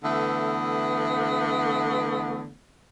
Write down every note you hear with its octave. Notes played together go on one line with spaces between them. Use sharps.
D3 E3 A3 B3